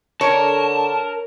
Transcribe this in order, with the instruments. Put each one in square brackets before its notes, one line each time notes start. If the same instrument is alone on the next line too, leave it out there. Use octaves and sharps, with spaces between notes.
[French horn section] D3 [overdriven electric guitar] A#4 [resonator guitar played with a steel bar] C#5 [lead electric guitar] A5